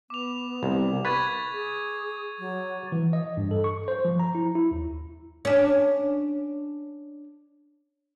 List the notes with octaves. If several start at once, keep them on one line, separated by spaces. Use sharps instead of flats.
B3 D6 F7
C2
B4 C#6 G#6 A6
G#4
F#3
E3
D#5
G2
A4
C#6
C5
F3
A#5
E4
E4
D#2
C#4 D4